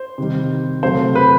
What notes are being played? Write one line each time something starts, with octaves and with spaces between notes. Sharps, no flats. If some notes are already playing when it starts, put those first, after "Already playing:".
Already playing: C5
C3 D#3 G3
C3 F#3 A3 C5
B4